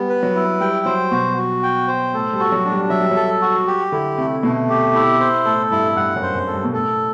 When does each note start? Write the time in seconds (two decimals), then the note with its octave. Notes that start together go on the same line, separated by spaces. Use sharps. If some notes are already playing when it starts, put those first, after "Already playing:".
Already playing: G3 B3
0.09 B4
0.23 F#3
0.35 E4
0.60 G3 G5
0.86 F#3 C5
1.11 B2 F#4
1.37 F#4
1.63 G5
1.88 C5
2.13 A2 A4
2.33 G3
2.40 F#4
2.52 F#3
2.65 D4
2.72 G3
2.90 F#3 E5
3.01 G3
3.11 F#3 A4
3.42 F#4
3.67 G4
3.92 D3 E4
4.18 C3 A3
4.43 B2 A3
4.69 G4
4.95 E4
5.20 C5
5.46 A2 A4
5.71 G2 E4
5.96 G2 F#5
6.16 F#2
6.22 C5
6.35 F#2
6.47 A4
6.54 G2
6.64 B2
6.73 A2 A4